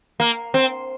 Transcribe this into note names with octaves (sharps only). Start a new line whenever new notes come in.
A#3
C4